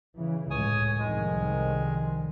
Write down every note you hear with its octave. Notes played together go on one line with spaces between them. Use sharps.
C#3 E3
C#2 A2 C#5 G#5 D#6
C2 F2 D#3 G#3